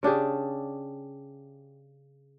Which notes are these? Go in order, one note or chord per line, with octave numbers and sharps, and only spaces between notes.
C#3 D4 G4 G#4